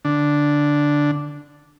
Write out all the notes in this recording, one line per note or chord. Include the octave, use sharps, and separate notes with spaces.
D3 D4